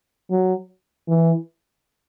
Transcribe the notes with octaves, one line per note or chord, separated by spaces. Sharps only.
F#3
E3